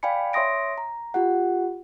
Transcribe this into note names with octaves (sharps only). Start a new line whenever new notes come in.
D5 F5 G5 G#5 B5 C#7
C#5 E5 C6 D#6 A#6 D7
A#5
F4 G4 F#5